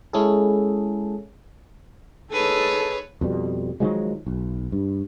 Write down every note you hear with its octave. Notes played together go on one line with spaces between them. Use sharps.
G#3 C#4 E4 G#4 A4
D#4 G#4 A4 B4 C#5
F2 B2 G3
D#3 F3 F#3 G#3
B1
G2